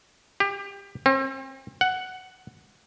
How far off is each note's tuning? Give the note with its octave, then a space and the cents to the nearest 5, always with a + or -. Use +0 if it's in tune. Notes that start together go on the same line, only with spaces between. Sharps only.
G4 +25
C4 +40
F#5 +5